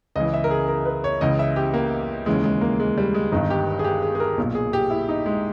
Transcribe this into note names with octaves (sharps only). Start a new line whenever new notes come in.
C#2 C#3 E3 D#5
E5
A#4
G#4
A#4
B4
C#5
C#2 C#3 E3 D#5
E5
G4
A#3
D#2 C#3 E3 G#3
G#3
A#3
G#3
G3
G#3
G1 G2 D#3 D#4
G4
G#4
G4
G#4
G#4
A#4
B1 A#2
G#4
G4
E4
D#4
G#3